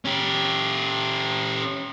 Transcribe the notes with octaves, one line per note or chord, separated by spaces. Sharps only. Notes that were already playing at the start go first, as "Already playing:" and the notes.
C#4 G4